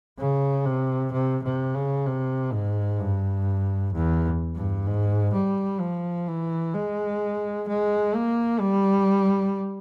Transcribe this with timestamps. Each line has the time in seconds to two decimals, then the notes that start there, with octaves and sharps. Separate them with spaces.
0.19 C#3
0.65 C3
1.12 C3
1.43 C3
1.75 C#3
2.06 C3
2.53 G#2
2.99 G2
3.94 E2
4.55 G2
4.87 G#2
5.33 G3
5.80 F3
6.28 E3
6.74 G#3
7.68 G#3
8.15 A#3
8.61 G3